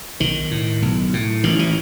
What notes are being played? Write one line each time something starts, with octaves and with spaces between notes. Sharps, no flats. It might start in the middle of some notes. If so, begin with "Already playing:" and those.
B1 D#3
A2
B1
A2
A1 D#3
E3